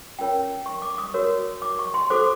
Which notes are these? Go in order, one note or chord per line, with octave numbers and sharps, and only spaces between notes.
C#4 F4 A#4 C#5 G5
C#6
D6
D#6
F#4 A#4 C#5
D6
C#6
C6
F#4 A4 C5 D6